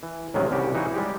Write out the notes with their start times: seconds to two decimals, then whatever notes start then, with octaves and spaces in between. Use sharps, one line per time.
0.03 E3
0.34 A1 C3 D#3 E3 F#3 G#3
0.51 C2 C#3 G3 F#4 G4
0.74 E3 D#4 E4 F#4 G#4
0.94 G3 G#3 G4